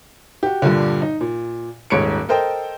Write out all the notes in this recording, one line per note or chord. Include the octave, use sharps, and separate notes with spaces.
F#4 G4
G2 A#2 D3
D#4
A#2
D#1 G#2 C#5 C#7 D7
A4 A#4 C5 D#5 G5